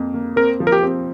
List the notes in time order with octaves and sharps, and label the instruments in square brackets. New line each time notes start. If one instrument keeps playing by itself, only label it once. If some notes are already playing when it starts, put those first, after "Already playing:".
Already playing: [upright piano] F2 A#3
A#3
[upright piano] C4 [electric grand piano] A#4
[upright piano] F3
[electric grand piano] A#4
G4
[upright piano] C4